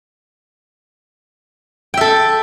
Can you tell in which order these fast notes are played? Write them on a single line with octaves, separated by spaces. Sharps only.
G5 E5 A4